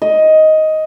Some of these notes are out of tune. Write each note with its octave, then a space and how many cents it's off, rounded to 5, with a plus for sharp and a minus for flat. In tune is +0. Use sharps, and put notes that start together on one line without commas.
D#5 +10